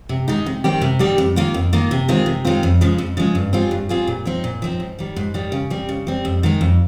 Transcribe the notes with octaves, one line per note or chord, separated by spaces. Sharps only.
C3
D#3 G#3 D#4
C3
D#3 G3 C4 G4
C3
D#3 G3 C4 G4
F2
D#3 A#3 F4
F2
D#3 A#3 F4
C3
D#3 G#3 C4 F4
C3
D#3 G#3 C4 F4
F2
C#3 F3 G#3
F2
C#3 F3 G#3
G2
G3 C4 F4 G#4
G2
G3 C4 F4 G#4
A#2
F3 C4 D#4
A#2
F3 C4 D#4
G#2
D#3 G3
G#2
D#3 G3
C#3
G3 C4
C#3
G3 C4
F2
D#3 G#3 D#4
F2